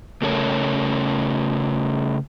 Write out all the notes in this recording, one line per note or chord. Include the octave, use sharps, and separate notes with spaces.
C#3 A3 C#4 A4 A#4 C#5